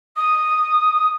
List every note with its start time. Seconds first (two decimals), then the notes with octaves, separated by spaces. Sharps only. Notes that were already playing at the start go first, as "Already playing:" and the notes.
0.16 D#6